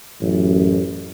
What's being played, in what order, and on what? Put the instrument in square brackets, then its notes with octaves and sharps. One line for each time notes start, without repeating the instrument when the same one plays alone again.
[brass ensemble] A1 F#2